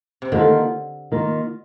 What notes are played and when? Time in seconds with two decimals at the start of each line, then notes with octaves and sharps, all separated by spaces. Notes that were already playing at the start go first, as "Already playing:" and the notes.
0.22 C3
0.32 D3 D#3 A#3 F4
1.12 D#3 A#3 F4